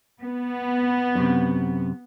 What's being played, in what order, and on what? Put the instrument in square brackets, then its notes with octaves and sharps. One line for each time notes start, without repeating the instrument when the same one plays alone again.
[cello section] B3
[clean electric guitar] F#2 C3